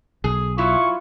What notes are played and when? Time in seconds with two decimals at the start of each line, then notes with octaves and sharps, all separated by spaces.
0.24 B1 G#4
0.58 F#3 E4 F4 C#6